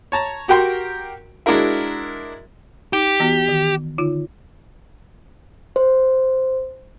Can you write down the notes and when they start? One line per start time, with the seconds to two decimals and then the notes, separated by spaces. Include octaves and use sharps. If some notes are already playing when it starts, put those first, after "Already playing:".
0.12 C#5 A5 A#5
0.48 F#4 G4 A#4 G5 C6
1.46 G#3 D4 E4 F#4 A#4 E5
2.93 D#4 G4 D6
3.20 E3 B3 F#4
3.48 D#3
3.98 D3 D#4 F4
5.76 C5